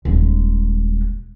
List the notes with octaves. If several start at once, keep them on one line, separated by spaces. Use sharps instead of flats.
D#1 G#3